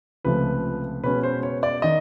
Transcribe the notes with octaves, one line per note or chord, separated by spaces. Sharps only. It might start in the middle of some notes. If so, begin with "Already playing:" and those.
C#2 C3 F3 A3 B4
B2 G#3 C#4 B4
C5
C#5
D5
D#3 D#5